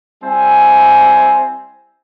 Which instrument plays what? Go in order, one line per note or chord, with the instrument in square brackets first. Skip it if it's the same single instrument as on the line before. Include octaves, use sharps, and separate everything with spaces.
[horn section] G3 C4 E4 G#5